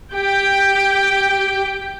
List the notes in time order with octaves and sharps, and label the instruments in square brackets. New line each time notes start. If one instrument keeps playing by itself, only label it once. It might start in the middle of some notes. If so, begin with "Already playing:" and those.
[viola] G4 G5